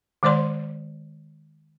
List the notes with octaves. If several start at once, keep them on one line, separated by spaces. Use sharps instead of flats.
D#3 G#3 C5 D5 C6